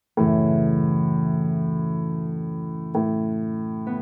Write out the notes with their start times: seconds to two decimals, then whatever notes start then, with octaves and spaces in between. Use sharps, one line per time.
0.17 F#2 A2 C#3 E3 A3
2.95 A2
3.87 B3